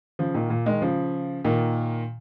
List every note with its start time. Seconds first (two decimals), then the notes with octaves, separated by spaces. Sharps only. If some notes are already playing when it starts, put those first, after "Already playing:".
0.19 C#3 F3
0.34 A#2 D#3
0.50 A#2
0.66 D#3 G#3
0.82 C#3 F3
1.45 A#2 D#3